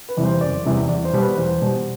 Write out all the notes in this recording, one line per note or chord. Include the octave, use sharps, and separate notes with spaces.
B4
E2 C3 E3 G3
C5
F#1 D5
E2 C3 E3 G3
E2 D5
C5
B2 G3
B4
E2 C5
B2 G3